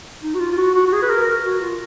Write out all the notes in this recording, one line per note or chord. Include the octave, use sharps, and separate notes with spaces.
D#4
F#4
F4
F4
F#4
F#4
F#4
G#4
B4
A#4
A#4
F#4
F4